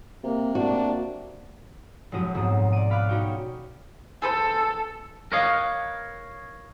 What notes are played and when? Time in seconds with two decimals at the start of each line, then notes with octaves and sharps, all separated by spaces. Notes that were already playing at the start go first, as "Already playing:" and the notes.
0.24 C3 A#3
0.55 A#3 D4 F#4
2.12 F1 F#2 G#3 F#4 D#6
2.35 B1 G#2 C4 D#6
2.73 D5 D#7
2.90 F5 B5 D6 F6 F#6
3.09 C#4 D#4 F#4 G5 C#6
4.22 G#4 A4 B4 C5 E6
5.32 A#4 B4 C#5 D#5 F5